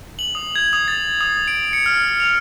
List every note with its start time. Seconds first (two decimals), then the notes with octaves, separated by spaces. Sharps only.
0.19 F#7
0.35 D#6
0.56 G#6
0.73 D#6
0.88 A6
1.21 D#6
1.48 D7
1.73 C#7
1.86 F6
2.20 F7